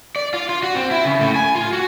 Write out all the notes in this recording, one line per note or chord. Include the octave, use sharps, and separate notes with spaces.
D5
F4
F4
F#4
C4
E4
C#3
A2
G#5
F4
F#4